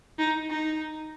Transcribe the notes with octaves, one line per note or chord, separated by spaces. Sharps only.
D#4
D#4